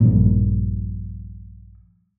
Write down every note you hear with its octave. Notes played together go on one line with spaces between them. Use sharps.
A#1 G2 A#2